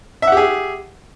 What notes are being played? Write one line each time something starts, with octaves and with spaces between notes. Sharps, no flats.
G4 G#4 E5 F#5